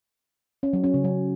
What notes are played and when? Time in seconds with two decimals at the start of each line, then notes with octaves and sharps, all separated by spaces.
0.63 C#4
0.73 F#3
0.84 C#4
0.94 C#3
1.04 F#3